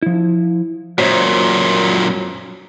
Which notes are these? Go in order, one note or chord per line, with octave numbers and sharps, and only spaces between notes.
F3 E4
F#2 A#2 F#4 C5 C#5